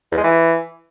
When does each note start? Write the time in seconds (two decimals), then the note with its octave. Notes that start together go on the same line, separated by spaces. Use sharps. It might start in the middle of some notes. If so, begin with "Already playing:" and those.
0.12 E2
0.18 G#3
0.24 E3